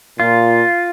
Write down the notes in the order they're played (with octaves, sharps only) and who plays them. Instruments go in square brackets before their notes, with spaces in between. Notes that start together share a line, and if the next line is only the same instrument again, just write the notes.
[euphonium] A#2 [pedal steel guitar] F4